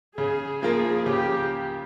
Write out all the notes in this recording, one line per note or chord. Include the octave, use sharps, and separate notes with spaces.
C#3 G#4
F3 A#3 F4 G#4 A#4
C#3 G4